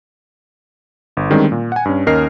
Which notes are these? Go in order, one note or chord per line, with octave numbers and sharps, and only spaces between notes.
G1
D3 D#3 G3 G#3 C4 C#4
A#2
F#5 G#5
G2 C#4
D#2 C#4 A#4 D#5 F6 C7